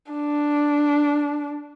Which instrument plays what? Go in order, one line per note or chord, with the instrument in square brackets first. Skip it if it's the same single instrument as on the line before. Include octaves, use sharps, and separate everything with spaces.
[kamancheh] D4